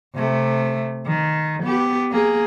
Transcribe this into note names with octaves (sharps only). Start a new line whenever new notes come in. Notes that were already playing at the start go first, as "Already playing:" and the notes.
C3 A3
D#3
B3 G4
A#3 G#4